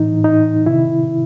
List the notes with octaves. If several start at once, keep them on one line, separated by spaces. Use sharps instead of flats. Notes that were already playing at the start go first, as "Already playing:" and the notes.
Already playing: A2 E3 D#4
D#4
C3 D#3 E4